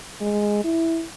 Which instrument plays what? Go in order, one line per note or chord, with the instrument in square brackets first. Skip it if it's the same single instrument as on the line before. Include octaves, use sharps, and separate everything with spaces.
[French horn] G#3
E4